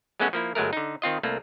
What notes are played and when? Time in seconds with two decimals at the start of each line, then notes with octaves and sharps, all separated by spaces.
0.20 F#3 G#3 A3 B3 C#4 F#4
0.33 F3 A#3 E4
0.55 G1 F#3 G#3 A3 A#4
0.73 D3 D#4
1.02 D#3 C4 F4 D#5
1.23 C2 A3 A#3